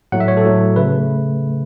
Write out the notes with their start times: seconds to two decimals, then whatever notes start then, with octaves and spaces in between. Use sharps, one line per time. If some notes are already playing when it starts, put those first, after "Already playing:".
0.12 A2 F#3 A3 F#5
0.20 E5
0.28 C#5
0.37 A4
0.44 A2 F#3 A3
0.76 C#3 A3 B4